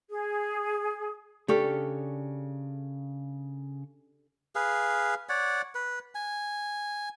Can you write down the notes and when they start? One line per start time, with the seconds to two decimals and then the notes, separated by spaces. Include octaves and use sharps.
0.10 G#4
1.48 C#3 D4 G4 A4 C#6 F6
4.55 G#4 B4 F5
5.29 C#5 D5 F#5
5.75 B4
6.15 G#5